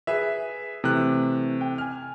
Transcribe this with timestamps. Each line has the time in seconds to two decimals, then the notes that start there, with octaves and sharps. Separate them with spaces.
0.07 G#4 B4 E5
0.84 C3 E3 A3 F#6
1.61 G5
1.78 G#5 F6